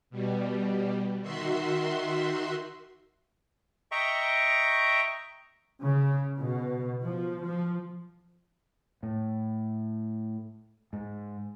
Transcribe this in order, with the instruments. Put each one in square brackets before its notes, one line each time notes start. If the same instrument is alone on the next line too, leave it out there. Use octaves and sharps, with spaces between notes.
[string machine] B2 G3
D#3 F#4 E5 C6
[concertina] D#5 E5 G5 A#5 C#6
[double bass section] C#3
B2
F3
F3
[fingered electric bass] A2
G#2